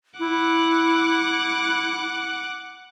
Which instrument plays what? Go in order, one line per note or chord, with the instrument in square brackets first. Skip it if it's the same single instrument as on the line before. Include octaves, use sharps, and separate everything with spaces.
[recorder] E4 [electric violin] F#5 D6